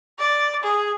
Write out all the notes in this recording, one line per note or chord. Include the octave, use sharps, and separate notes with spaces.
D5
G#4